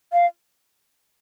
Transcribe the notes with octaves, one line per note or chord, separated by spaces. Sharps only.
F5